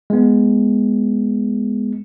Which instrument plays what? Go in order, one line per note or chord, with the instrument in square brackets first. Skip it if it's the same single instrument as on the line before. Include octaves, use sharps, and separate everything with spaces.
[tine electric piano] G#3 B3